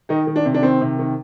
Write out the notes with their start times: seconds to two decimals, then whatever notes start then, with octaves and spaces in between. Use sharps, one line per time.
0.09 D#3 D#4
0.27 D#3
0.36 D4
0.45 C3
0.54 D4
0.62 D#3 C4
0.81 C3
0.99 D#3